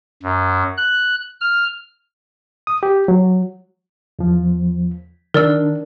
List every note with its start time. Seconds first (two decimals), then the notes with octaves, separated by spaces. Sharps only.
0.23 F#2
0.77 F#6
1.41 F6
2.67 D#6
2.83 G4
3.08 F#3
4.19 E2 F3
5.34 D#3 D4 A#4 D5 E6